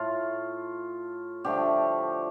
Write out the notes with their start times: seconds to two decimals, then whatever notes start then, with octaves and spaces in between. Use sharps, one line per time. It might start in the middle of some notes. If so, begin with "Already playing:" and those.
Already playing: A2 A3 F4
1.44 D3 F3 A3 G4